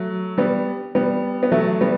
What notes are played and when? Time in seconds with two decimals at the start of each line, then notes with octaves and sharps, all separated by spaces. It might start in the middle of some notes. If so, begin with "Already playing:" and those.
Already playing: F#3 A3
0.38 G3 B3
0.95 G3 B3
1.43 B3
1.52 F#3 A3
1.81 G3 B3